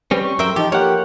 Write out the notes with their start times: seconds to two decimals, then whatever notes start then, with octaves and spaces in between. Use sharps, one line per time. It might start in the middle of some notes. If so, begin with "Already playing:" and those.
0.11 G3 C4 C#4 B4
0.23 C#6
0.39 F#2 A#4 C5 E5 G5
0.56 F3 D#4 G4
0.72 A#3 G4 C#5 F#5